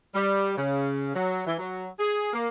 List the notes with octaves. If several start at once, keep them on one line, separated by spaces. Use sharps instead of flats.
G3
C#3
F#3
E3
F#3
G#4
A#3